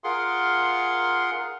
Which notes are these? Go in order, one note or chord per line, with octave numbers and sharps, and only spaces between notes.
F4 G#4 A#4 F5 F#5 C6